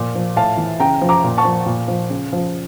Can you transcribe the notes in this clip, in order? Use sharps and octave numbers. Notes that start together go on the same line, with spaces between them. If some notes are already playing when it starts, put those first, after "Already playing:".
Already playing: A#2 F3
F3
A2 F5 A5
E3
C#3 G5 A#5
F3
A#5 D6
A#2
A5 C#6
F3
A#2
F3
C#3
F3